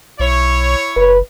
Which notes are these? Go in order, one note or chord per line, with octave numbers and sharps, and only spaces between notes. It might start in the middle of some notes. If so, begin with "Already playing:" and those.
B1 E4 C#5
F#1 B4